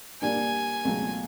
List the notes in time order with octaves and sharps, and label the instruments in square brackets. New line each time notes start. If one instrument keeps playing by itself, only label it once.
[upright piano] A#2 G3 A#3 D4 [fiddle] G#5
[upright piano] C#2 B2 F#3 A3